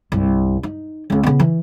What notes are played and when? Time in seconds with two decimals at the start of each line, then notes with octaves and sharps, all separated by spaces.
0.12 C2 G2
0.63 D#4
1.10 C#2 C#4
1.23 C#3 B3
1.40 E3